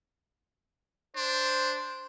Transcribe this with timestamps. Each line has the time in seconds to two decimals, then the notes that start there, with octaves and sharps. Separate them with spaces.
1.16 D4 C5